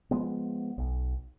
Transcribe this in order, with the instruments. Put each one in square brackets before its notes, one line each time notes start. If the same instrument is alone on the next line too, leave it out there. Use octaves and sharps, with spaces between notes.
[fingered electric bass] F3 G#3 B3
B1